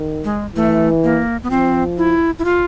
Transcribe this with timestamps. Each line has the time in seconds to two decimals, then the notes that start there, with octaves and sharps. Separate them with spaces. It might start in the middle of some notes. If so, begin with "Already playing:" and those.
Already playing: D#3
0.24 G#3
0.56 E3 A3
1.04 A#3
1.43 B3
1.50 F3 C4
1.98 E4
2.39 E4
2.45 F4